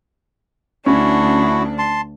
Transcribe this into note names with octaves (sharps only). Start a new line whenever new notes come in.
D2 C#4 D4 E4 F#4
A5 C6